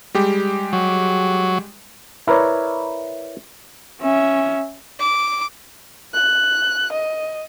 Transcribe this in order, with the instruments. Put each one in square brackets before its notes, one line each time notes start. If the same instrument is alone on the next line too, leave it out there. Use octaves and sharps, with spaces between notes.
[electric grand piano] G3 G#3 G4
[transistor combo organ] F#3
[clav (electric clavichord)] E4 A#4 B4 C#5 D5
[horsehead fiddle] C#4 E5
[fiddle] D6
[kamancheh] F#6
D#5